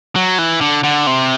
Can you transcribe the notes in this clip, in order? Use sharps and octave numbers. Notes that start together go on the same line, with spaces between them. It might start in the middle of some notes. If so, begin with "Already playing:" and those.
F#3
E3
D3
D3
C3